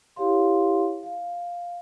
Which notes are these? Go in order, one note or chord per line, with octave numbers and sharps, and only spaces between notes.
E4 G4 C#5 F5 C6
F5